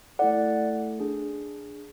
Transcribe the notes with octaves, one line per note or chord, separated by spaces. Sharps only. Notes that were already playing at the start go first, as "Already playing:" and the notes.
A3 E4 A4 D5 F#5
D4 G#4